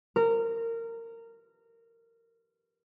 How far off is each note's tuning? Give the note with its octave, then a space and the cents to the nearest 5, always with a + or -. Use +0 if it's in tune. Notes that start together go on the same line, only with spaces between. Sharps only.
A#4 -20